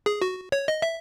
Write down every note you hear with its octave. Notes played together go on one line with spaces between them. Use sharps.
G#4
F#4
C#5
D#5
E5